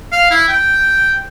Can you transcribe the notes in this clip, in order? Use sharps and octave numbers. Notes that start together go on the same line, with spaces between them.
F5
E4
G5